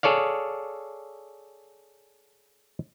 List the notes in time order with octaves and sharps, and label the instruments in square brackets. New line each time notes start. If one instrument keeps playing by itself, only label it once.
[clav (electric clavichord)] G#4 A4 C#5 D5 F5